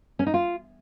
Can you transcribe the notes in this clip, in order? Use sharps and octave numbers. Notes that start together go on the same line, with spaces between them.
C#4
D#4
F4